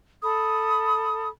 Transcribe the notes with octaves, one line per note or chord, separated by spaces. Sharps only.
A4 B5 D#6